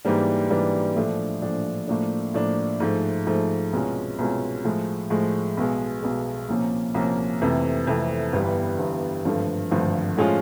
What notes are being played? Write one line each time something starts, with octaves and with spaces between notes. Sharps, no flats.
G#2 E3 G3 A#3 D4
G#2 E3 G3 A#3 D4
A#1 A2 F3 A3 D4
A#1 A2 F3 A3 D4
A2 F3 A#3 D4
A2 F3 A#3 D4
G#2 F3 A3
G#2 F3 A3
C2 B2 G#3 C#4 F4
C2 B2 G#3 C#4 F4
A2 F3 G#3
A2 F3 G#3
B1 B2 G#3
B1 B2 G#3
C2 A#2 F3 A#3 C#4
C2 A#2 F3 A#3 C#4
F2 C3 E3 A3
F2 C3 E3 A3
G1 G2 E3 G3 B3
G1 G2 E3 G3 B3
G#1 G2 D3 F3 A3
G#1 G2 D3 F3 A3
A2 F3 G#3 C#4 F4